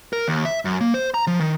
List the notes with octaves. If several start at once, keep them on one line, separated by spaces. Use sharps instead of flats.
A#4
D#2
E5
F#2
A#3
C5
A#5
F3
D#3